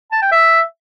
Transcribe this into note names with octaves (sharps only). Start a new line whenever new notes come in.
A5
G5
E5